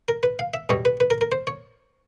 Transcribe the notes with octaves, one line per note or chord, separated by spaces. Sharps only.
A#4
B4
F5
E5
E2 B2 G3 C#5
B4
B4
A#4
A#4
C5
C#5